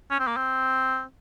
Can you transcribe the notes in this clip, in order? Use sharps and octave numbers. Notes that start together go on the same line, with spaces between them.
C#4
C4
A#3
C4